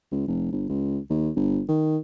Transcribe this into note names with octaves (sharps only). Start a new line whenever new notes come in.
C#2
F1
G1
C#2
D#2
G1
D#3